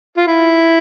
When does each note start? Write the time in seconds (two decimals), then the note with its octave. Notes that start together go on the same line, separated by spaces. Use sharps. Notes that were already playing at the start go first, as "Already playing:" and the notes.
0.17 F4
0.27 E4